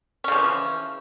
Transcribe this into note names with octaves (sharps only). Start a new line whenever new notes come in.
C#3 E3 F3 C#4